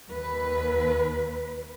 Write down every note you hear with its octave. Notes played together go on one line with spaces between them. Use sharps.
D#2 B4